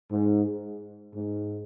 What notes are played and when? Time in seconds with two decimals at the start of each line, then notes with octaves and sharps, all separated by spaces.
0.11 G#2
1.14 G#2